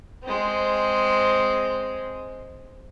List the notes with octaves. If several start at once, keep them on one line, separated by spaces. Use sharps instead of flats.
G#3 C4